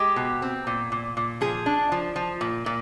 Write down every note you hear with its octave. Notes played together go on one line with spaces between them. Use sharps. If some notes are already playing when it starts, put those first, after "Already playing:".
Already playing: G#3 G4
B2
C4
A#2
A#2
A#2
F3 G#4
D4
F3
F3
A#2
A#2